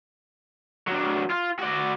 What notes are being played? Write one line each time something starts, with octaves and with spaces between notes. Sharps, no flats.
F#3 D4
F4
F#4 D5